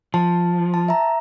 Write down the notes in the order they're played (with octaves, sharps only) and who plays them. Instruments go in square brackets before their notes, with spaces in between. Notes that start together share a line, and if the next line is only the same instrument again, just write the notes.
[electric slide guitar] F3 [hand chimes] A5
[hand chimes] A5
E5 A#5